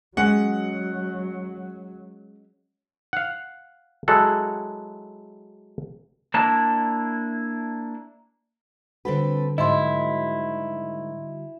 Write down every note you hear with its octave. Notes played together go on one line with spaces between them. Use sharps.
F#3 G#3 C#4 F#5
F5 F#5
F#3 G#3 E4 A4 F#5
A#3 D4 E4 A5
D3 G3 C4 F#4 A4 B4
G#2 D#3 F#3 E4 D#5 C6